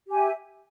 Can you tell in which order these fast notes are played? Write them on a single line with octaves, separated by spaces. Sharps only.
G4 G#5 E5